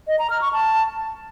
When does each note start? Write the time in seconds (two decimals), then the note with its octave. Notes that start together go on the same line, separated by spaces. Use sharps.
0.07 D#5
0.19 A#5
0.30 F6
0.41 C#6
0.53 A5